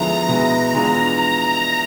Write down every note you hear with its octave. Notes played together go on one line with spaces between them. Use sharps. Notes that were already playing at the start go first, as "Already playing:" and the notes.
Already playing: D3 F3 G#3 B3 E4 A#5
B2 G#3 B3 E4
E3 G#3 B3 D4 F4